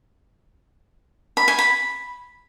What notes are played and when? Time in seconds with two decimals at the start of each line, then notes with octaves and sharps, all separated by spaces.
1.37 B5
1.48 G#5
1.59 B5